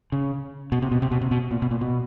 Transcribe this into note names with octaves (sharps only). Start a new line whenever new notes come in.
C#3
B2
C3
B2
C3
B2
C3
B2
A#2
B2
A#2
B2